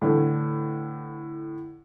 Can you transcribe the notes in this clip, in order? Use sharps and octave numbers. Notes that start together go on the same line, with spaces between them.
A2 D3 E3 A3